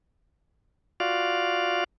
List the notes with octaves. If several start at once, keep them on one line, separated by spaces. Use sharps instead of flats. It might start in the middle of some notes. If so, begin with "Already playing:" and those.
F4 F#4 D5 F5